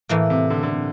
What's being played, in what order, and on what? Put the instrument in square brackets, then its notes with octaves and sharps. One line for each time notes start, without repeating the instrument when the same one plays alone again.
[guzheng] A2 E3 A#3
[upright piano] C3
D3
D3
C3